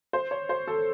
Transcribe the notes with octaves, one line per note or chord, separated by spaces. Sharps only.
C5
C#5
C5
A4